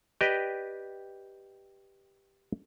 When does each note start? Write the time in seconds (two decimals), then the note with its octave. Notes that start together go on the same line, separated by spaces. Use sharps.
0.21 G4 B4 D5 D#5 G5